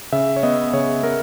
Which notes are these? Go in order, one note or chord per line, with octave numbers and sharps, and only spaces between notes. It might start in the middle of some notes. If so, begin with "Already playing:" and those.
C#3 E5
C#5
B3 D#5
C#3 C#5
B3 A#4